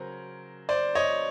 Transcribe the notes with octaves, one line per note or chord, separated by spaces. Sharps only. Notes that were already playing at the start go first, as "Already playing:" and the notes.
Already playing: C#3 F#3 A#4 C5
C5 D5
C#5 D#5